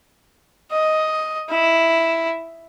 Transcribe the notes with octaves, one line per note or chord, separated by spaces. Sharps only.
D#5
E4